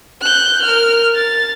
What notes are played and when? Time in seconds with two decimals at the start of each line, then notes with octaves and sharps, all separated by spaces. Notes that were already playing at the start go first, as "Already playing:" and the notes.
0.21 F#6 G6
0.63 A#4 F6
1.15 A6